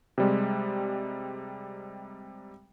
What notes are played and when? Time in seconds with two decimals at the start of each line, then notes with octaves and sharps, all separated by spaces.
0.18 C3 G3 G#3